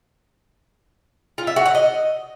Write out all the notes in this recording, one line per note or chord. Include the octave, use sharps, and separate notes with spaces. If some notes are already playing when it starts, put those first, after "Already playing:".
F4
E5
F#4
F#5
D#5